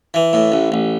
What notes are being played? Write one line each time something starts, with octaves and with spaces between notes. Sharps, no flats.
E3
A2
A1
A1